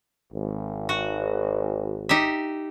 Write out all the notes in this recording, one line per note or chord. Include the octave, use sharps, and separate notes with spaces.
G#1
F#4
D#4 G4 E5